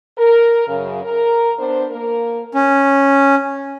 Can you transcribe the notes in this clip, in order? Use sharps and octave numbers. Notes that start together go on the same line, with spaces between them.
A#4
F#2 C#3
A#4
B3 D4 C5
A#3 A#4
C#4